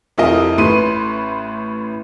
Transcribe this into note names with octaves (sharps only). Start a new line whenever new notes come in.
F1 C3 E4 F4 A#4 D#5
A1 A2 B4 C6 D#7